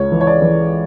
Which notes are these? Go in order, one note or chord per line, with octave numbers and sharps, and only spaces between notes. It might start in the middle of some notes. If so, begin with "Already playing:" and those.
Already playing: C#2 C#5
E3
C#5
D5
E3